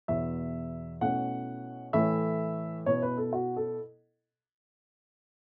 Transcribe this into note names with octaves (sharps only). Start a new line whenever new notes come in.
E2 B2 B3 E4 E5
B2 A3 C#4 E4 F#5
A2 E3 A3 E4 E5
B2 B3 E4 C#5
B4
A4
F#4
A4